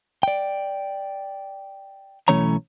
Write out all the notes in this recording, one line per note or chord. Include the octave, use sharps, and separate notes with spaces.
D5 G5
B1 E3 A3 C#4 C#5 A#5